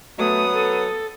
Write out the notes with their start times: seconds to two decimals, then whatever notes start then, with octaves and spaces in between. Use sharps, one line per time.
0.19 F#3 A3 B3 D#6
0.53 A4